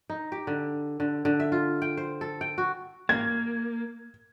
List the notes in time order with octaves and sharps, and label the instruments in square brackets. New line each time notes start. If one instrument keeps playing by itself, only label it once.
[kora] D#4
G4
D3
D3
D3
E5
F4
G5
C5
A4
G5
F#4
[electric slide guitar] A#3 [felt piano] G#6